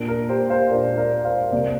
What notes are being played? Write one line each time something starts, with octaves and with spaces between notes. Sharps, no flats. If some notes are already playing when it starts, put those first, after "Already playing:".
Already playing: A#2 A#3 D4
A#4
G4 C5
C5 F5
A#2 A#3 D4 A#4 D5
A#4 D5
C5 F5
C2 C3 A#3 A#4 D5